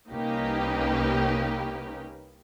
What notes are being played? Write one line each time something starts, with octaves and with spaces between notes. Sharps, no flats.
C2 A#3 C#4 D#4 G4 B4